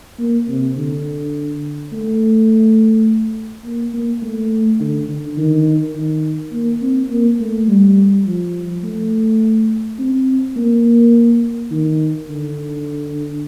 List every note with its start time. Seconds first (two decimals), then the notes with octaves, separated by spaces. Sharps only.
0.19 A#3
0.48 C3
0.76 D3
1.93 A3
3.65 A#3
3.94 A#3
4.22 A3
4.80 D3
5.08 D3
5.37 D#3
5.95 D#3
6.52 A#3
6.82 C4
7.10 A#3
7.39 A3
7.68 G3
8.25 F3
8.83 A3
9.99 C4
10.56 A#3
11.71 D#3
12.29 D3